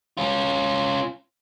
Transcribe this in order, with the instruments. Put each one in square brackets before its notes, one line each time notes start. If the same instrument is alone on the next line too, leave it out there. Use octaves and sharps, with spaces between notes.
[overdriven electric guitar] C#4 F4